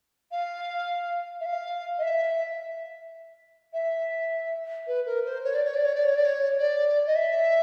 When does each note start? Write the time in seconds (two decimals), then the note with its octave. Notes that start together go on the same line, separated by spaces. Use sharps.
0.32 F5
1.41 E5
1.46 F5
1.98 D#5
2.02 E5
3.73 E5
4.87 B4
5.06 A#4
5.25 C5
5.44 C#5
5.55 D5
5.65 C#5
5.75 D5
5.85 C#5
5.95 D5
6.05 C#5
6.15 D5
6.25 C#5
6.58 D5
7.07 D#5
7.15 E5